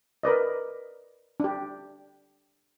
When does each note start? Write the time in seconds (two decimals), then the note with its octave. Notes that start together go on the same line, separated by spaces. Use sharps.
0.23 A#4 B4 D5 D#5
1.40 D4 G4